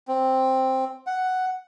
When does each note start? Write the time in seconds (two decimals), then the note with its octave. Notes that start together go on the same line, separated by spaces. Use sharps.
0.08 C4
1.07 F#5